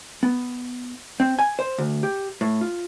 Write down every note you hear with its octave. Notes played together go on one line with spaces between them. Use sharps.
B3
C4
G#5
C5
D2
G4
A2
F4